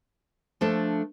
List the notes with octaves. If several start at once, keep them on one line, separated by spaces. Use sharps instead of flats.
F3 A3 D4 A4